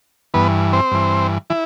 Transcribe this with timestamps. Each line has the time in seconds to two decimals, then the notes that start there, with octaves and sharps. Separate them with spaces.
0.34 G2 E3 B3 B4
0.73 C4 C5
0.91 G2 E3
1.50 E3 E4